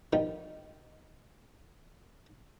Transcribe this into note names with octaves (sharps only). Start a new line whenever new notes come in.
D#3 F3 G3 B3 D#4